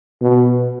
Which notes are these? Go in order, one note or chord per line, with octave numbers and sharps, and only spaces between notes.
B2